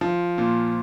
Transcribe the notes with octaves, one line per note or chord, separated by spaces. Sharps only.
F3
A#2